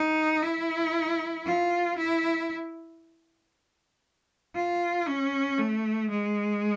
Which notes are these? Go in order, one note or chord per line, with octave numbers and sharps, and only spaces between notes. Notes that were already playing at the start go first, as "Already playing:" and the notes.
Already playing: D#4
E4
F4
E4
F4
C#4
A3
G#3